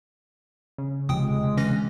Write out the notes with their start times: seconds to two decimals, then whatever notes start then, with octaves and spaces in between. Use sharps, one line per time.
0.78 C#3
1.09 E1 C3 F3 G#3 G5 D#6
1.57 E3 C#4 A#6